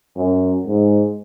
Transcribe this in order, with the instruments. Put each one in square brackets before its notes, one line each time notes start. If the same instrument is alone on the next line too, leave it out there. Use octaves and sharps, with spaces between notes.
[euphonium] F#2
G#2